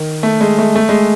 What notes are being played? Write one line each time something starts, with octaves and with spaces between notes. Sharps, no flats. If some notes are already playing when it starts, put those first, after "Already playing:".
Already playing: D#3
A3
G#3
A3
A3
G#3